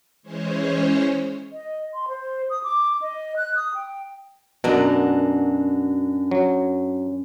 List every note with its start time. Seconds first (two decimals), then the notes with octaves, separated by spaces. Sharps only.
0.23 E3 G#3 C#4 C5 C#5
1.51 D#5
1.94 C6
2.08 C5
2.50 D#6
2.63 D6
3.02 D#5
3.37 F#6
3.56 D#6
3.75 G5
4.64 F#2 B2 D4 A#5
6.31 F#3